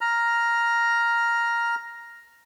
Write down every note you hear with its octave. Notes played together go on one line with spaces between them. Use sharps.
A#5 F6